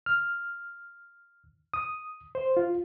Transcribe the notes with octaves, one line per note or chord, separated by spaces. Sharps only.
F6
D#6
C5
F4